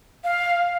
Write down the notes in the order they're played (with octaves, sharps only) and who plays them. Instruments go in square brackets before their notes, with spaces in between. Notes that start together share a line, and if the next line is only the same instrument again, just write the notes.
[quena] F5